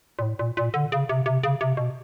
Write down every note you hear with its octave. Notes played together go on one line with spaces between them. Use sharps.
A#2
A2
A#2
A#2
D3
C#3
C3
C3
C#3
C3
B2